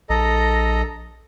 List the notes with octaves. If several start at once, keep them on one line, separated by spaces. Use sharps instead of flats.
A#1 A4 D#5 A#5